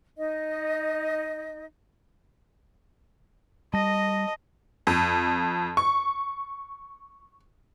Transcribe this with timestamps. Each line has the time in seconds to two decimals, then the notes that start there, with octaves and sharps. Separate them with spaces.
0.16 D#4 D#5
3.74 G3 D#5 A5 A#6
4.87 F2
5.77 C#6